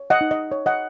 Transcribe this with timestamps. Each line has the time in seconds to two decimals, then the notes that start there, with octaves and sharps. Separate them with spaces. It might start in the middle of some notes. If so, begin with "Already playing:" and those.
Already playing: C#5
0.10 D#5 F#5
0.21 D#4
0.31 D#5
0.52 C#5
0.66 D#5 F#5